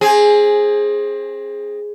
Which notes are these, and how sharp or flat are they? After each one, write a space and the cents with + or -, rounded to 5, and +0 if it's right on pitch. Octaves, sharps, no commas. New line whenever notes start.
C4 +30 G#4 +0